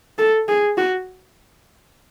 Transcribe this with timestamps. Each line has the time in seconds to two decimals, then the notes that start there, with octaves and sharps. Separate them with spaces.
0.18 A4
0.48 G#4
0.78 F#4